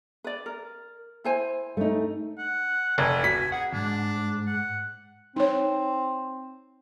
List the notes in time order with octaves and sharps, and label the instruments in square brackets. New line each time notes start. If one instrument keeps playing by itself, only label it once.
[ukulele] B4 D5
A#4
E4 C5 G#5
[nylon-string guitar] A3 D#4
[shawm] F#5
[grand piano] F1 [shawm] G#5
[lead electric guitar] F#4 [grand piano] B6
[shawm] G#4 [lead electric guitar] F#5
[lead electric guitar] D#2 G#2 [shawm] D4
[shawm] F#5
[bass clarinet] C4 [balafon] D#4 C#5